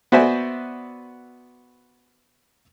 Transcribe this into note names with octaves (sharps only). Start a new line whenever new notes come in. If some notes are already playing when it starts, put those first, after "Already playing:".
B3 F#4 C5 D5 E5 G#5